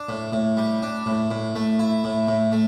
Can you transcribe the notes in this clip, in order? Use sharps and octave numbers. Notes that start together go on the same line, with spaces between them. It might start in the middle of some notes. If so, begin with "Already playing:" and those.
Already playing: D4
A2
A2
G3
D4
A2
A2
A3
E4
A2
A2
A3